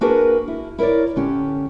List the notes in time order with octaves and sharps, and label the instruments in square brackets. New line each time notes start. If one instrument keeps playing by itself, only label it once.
[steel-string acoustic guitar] A#3 D4 F#4 G#4 A#4 B4
E4
E4 A#4 B4 C#5 D5
D3 C#4 G4